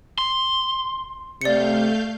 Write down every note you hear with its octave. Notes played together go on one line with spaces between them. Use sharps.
C6
C3 A3 D5 F5 G6 C#7